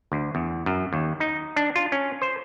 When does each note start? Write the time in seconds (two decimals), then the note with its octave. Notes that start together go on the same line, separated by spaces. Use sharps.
0.12 D2
0.35 E2
0.66 F#2
0.93 D#2
1.20 D#4
1.56 D4
1.76 F4
1.92 C#4
2.22 C5